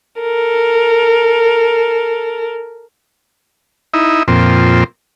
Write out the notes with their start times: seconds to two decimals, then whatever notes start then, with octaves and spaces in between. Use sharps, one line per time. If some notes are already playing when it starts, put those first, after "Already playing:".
0.22 A4 A#4
3.94 D#4 E4
4.28 F2 A#2 C4